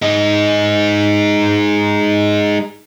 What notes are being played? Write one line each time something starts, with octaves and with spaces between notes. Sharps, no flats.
G#3 D#4